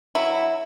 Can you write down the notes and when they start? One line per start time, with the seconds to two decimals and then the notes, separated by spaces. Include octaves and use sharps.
0.15 F#3 E4